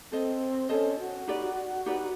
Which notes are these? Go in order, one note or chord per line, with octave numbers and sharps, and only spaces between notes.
C4 A4 C5 D#5
C#4 A4 C5 D#5
F#4
D#4 G4 B4 D5
D#4 G4 B4 D5